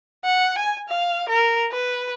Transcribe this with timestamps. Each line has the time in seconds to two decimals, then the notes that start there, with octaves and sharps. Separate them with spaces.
0.25 F#5
0.58 G#5
0.89 F5
1.29 A#4
1.72 B4